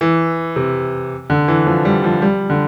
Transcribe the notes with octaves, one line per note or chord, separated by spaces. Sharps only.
E3
C3
D3
E3
F3
G3
F3
G3
D3